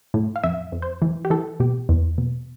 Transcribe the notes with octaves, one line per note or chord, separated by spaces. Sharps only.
A2
F5
F2 E5
F2
C5
E3
G4
E3 A4
B2 G4
E2
B2